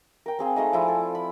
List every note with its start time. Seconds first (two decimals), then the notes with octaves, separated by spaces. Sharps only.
0.26 A#4 G5
0.39 C4 G#4 F5
0.56 G#3 A3 D#4 D#5
0.73 F3 E4 D5 G#5
0.88 A4
1.15 B5